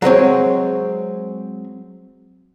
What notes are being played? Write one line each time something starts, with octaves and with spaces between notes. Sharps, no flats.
F#3 G#3 C4 C#5